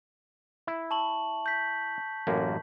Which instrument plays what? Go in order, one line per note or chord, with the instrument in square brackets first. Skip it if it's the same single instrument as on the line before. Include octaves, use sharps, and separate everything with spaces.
[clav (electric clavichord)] E4
[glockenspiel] A5 C#6 F#7
G6 B6
[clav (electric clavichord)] A1 F#2 A#3